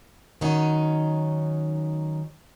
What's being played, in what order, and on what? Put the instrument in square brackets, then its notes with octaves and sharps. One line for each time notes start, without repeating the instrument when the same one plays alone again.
[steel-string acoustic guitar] D#3 F#3 C#4 D#4